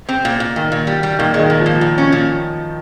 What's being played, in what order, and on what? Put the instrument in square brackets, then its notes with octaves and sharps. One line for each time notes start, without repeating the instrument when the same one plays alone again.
[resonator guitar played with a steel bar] C4
A#2
A#2
[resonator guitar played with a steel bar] A#2 [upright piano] D#3
[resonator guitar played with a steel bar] A#2
G3
G3
[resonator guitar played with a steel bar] A#2 [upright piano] D#3
[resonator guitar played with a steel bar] G#3
[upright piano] D#3
[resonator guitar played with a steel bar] A#2
[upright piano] F3
[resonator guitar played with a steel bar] A#2
A#2
C#4
A#2